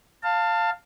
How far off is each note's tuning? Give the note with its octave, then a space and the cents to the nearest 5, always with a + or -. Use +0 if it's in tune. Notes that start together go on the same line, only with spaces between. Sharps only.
F5 +0 A5 +25